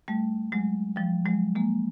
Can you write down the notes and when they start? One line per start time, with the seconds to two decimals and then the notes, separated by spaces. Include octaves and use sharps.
0.08 G3 A3
0.52 F#3 G#3
0.96 F3 G3
1.26 F#3 G#3
1.56 G#3 A#3